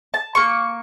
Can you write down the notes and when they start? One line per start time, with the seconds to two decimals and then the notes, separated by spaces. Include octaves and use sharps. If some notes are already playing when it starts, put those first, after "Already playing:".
0.14 A5
0.35 A#3 C#6